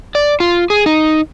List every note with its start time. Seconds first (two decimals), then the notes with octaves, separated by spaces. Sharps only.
0.15 D5
0.40 F4
0.70 G#4
0.86 D#4